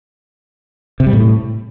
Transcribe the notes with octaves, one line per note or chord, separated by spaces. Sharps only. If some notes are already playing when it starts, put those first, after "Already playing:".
C3
G3
A2